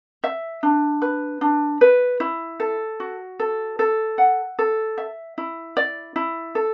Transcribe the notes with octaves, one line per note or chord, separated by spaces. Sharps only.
E5
D4
B4
D4
B4
E4
A4
F#4
A4
A4
F#5
A4
E5
E4
D5
E4
A4